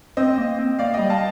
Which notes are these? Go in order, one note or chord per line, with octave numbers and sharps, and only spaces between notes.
C4 C5 D#5
C4
A#3
C4
A#3 D5 F5
G3 D#5 G5
F5 A5